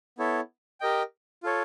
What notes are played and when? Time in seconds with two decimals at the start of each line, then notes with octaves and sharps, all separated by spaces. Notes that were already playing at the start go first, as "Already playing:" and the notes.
0.18 B3 E4 A4 C#5
0.80 G4 A#4 D#5 G5
1.43 F4 A4 C#5